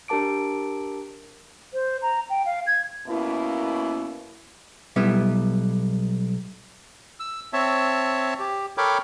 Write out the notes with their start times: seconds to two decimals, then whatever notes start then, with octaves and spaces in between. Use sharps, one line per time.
0.08 D4 G4 A#4 A5 D6 D7
1.74 C5
2.02 A#5
2.30 G5
2.46 F5
2.67 G#6
3.07 B2 A#3 C#4 E4
4.96 B1 G3 B3 E4
7.20 E6
7.53 C4 C#5 E5 A5
8.39 G4
8.78 A4 A#4 C#5 G5 B5 D6